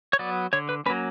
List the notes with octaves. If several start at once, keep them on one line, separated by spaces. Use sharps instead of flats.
C#5
F#3 B3 D5
D3 C#5
B4
F#3 A#3 C#4 B4